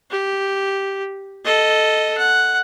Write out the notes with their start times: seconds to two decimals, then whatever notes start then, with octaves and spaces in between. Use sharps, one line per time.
0.11 G4
1.45 A4 D#5
2.17 F#5